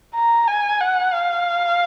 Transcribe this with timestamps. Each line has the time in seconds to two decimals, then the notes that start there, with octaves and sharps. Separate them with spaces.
0.15 A#5
0.48 G#5
0.80 F#5
1.13 F5